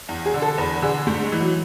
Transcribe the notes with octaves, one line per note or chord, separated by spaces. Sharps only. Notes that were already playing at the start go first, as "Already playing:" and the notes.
E2
G#4
D3
A4
E2 B4
D3 G#4
G#2 A3
G#3
E3
F#3